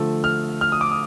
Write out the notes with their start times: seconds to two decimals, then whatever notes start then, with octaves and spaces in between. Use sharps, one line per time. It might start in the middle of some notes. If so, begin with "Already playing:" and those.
Already playing: D3 F3 A3
0.24 F6
0.61 F6
0.72 D#6
0.81 D6
0.91 D#6